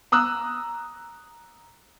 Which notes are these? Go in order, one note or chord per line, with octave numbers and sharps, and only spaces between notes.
A#5 D#6 E6 F#6